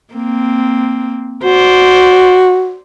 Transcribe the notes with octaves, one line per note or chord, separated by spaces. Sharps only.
A#3 C4
F#4 C5 D5